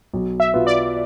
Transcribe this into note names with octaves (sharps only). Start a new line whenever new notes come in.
B1
E5
B2 B3 F4
D5